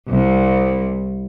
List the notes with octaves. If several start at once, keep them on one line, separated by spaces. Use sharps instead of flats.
C2